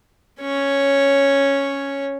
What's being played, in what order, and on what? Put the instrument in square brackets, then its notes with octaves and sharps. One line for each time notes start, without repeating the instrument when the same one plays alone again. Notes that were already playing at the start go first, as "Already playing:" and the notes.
[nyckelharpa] C#4 C#5